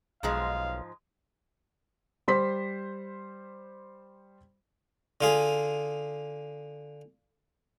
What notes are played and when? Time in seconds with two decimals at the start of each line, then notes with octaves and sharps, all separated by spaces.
0.23 B1 G#2 F3 G#3 F5
2.28 G3 C5 C6 B6
5.21 D3 F4 G#4